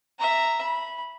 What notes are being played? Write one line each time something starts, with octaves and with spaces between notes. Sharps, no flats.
E5 A#5
B5